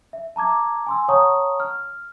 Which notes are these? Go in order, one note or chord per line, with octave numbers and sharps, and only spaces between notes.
E5
A5 A#5 D6 G#6
G#5 C6 E6
C#5 F#5 A5 A#5 C#6 D#6
F6